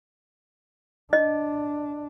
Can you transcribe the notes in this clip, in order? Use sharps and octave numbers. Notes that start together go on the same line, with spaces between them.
D4 D#5